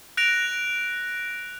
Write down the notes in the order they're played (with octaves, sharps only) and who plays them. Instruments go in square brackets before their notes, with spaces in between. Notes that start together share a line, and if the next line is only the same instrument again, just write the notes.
[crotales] F#6 A#6 D7 F7